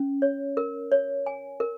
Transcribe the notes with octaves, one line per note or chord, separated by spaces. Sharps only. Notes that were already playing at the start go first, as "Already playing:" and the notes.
Already playing: C#4
C#5
A#4
C#5
G#5
A#4